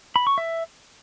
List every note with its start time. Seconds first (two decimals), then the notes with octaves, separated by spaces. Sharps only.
0.16 B5
0.27 C#6
0.38 E5